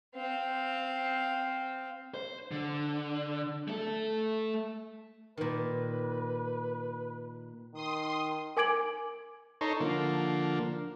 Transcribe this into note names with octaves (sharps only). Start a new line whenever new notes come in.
C4 F5
C5
D3
A3 A4
A#2 D#3 B4
D#3 C6 D#6
A#4 G#5 D6 G#6 D7 F#7
D#4 A4 C#5 A#5 C6
D3 F3 A#3